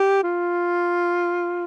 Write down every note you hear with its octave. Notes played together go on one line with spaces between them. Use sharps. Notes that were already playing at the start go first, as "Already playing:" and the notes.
Already playing: G4
F4